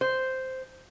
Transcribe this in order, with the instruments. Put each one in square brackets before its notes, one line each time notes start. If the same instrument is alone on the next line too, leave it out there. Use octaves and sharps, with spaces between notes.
[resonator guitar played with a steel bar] C5